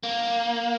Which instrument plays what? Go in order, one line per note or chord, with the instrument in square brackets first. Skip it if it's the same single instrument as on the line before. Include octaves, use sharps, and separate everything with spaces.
[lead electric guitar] A#3